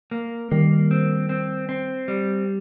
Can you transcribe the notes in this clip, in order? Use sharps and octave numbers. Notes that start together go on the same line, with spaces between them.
A#3
D#3 G3 A#3
C4
C4
C4
G3